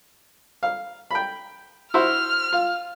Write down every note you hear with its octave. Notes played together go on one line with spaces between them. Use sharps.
F5
G5 B5
E4 F#4 C5 F6
F4